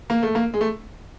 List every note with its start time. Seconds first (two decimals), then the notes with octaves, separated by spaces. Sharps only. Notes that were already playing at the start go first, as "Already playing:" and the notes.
0.10 A#3
0.23 A3
0.35 A#3
0.54 G#3
0.61 A3